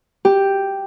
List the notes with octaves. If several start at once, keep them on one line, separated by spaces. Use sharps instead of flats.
G4